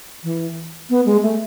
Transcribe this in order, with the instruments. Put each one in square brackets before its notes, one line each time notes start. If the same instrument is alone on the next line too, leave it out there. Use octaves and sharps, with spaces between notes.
[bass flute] E3
B3
G#3
A3